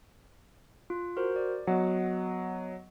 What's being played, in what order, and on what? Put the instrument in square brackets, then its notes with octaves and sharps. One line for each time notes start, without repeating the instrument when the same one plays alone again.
[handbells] F4
F#4 A#4 C5
D5
[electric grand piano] F#3 [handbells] B3 D#5 F#5